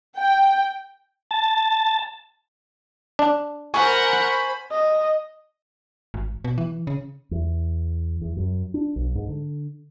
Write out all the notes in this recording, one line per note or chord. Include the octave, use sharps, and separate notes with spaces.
G5
A5
D4
A#4 C5 F#5 G#5 B5 C#6
D#5
G#1
B2
E3
C#3
E2
E2
F#2
D4
B1
G#2
D3